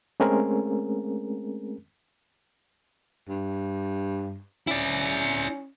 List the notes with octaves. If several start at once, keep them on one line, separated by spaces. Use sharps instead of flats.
G#3 A3 C4 C#4 G#4 A#4
G2
C#4 E4 D5